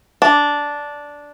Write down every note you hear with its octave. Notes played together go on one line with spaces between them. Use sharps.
D4